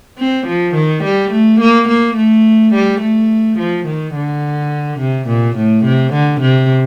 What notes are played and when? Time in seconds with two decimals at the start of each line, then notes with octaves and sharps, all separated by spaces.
0.18 C4
0.47 F3
0.75 D#3
1.04 G3
1.31 A3
1.60 A#3
1.88 A#3
2.16 A3
2.74 G3
3.01 A3
3.58 F3
3.86 D#3
4.15 D3
5.00 C3
5.28 A#2
5.56 A2
5.85 C3
6.13 D3
6.41 C3